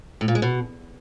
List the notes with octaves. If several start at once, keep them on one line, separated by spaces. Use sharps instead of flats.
A2
A#2
G#3
B2